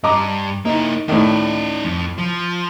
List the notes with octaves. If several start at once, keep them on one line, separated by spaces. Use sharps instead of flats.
G2 D#5 A#5 D6
A#3 D#4 E4
A2 D#3 D#4 D5
F2
F3